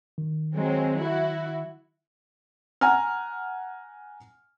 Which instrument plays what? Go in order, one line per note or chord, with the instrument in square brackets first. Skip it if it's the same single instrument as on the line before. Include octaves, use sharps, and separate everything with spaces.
[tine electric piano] D#3
[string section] F#3 G#3 C4
E4 F#4
[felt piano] F#5 G#5 A#5 F6